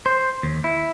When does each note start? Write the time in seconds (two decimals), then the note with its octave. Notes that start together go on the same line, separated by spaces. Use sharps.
0.06 C5
0.43 D#2
0.64 E4